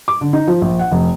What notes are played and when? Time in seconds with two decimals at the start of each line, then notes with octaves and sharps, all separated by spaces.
0.08 D6
0.21 D3
0.33 D#4
0.47 F3
0.62 A#1
0.79 F#5
0.91 F1